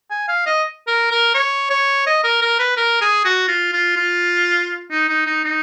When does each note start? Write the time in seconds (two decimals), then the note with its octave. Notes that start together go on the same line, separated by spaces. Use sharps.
0.11 G#5
0.28 F5
0.46 D#5
0.88 A#4
1.11 A#4
1.35 C#5
1.70 C#5
2.07 D#5
2.24 A#4
2.42 A#4
2.59 B4
2.77 A#4
3.01 G#4
3.25 F#4
3.48 F4
3.72 F4
3.96 F4
4.91 D#4
5.09 D#4
5.27 D#4
5.44 D#4